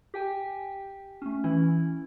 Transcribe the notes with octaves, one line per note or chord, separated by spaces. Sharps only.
G4 G5 G#5
A3 C#4
E3 C#4 E4